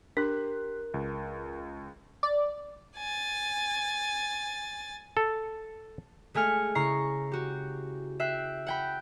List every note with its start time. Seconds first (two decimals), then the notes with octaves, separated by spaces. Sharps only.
0.17 D4 G4 A#4 C6 F#6
0.94 C#2
2.23 D5
2.97 G#5 A6
5.17 A4
6.34 G#3 A3 G#5 F6 C#7
6.75 C#3 E4 A#5 C#6 C7
7.32 F#4 G4
8.20 E5 G5 F#6 C7
8.67 F#5 G5 B5